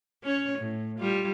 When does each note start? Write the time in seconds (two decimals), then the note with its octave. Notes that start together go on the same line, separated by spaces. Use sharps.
0.23 C#4 C#5
0.58 A2
0.99 G3 F4